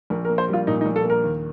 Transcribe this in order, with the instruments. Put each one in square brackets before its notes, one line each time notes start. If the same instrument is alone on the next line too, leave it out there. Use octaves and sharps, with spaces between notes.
[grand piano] A#1 [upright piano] A#4
[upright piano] A#4
[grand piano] A#3
[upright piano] C5
[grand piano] G3 [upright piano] F4
[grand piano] A#2 [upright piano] D#4
[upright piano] D#4
[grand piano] A#1
[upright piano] A4
[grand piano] A#3
[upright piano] A#4
[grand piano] D#2